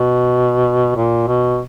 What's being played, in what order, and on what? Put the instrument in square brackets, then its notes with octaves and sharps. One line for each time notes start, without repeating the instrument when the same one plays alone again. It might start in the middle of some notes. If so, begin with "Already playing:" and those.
Already playing: [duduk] B2
A#2
B2